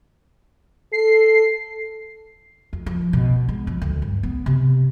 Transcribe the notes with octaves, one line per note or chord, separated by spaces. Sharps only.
A4 C7
F2
F3
B2
G#3
F3
D2
G2
B3
C3